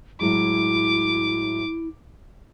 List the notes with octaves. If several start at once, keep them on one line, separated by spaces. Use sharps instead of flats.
A2 F#3 G#3 E4 D6